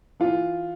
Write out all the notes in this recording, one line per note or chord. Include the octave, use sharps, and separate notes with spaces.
E3 F4